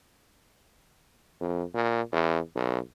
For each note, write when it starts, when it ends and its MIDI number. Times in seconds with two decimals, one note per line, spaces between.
1.40 1.63 41
1.74 2.02 46
2.12 2.39 40
2.56 2.79 35